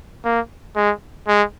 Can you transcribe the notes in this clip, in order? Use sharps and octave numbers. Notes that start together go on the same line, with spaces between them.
A#3
G#3
G#3